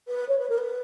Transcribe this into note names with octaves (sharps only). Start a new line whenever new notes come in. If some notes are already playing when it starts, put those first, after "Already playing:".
B4
C#5
B4
A#4
B4